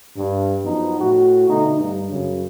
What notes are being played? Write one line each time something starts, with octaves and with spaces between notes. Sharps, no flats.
G2
F#2 F3 B3 D#4
A2 F#4
B2 D3 A3 D#4
G2
F#2 C#3